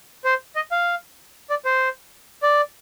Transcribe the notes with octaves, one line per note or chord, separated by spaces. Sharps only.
C5
D#5
F5
D5
C5
D5